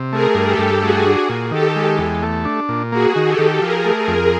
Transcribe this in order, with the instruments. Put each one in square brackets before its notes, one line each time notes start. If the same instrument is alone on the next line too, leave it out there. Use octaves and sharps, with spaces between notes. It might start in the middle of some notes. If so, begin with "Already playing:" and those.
Already playing: [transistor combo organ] C3
[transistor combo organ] A3 [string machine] G#4 A#4
[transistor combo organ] G2
[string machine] G4 A4
[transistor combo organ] G2
[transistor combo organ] A3 [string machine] F#4 G#4
[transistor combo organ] D4
A#2
[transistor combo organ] D#3 [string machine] G4 A4
[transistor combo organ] G#3
E2
A3
D4
A#2
[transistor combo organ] A#3 [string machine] F#4 G#4
[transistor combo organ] D#3
[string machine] G4 A4
[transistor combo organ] D#3
[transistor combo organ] F3 [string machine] G#4 A#4
[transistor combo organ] A3
[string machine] G#4 A#4
[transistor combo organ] F2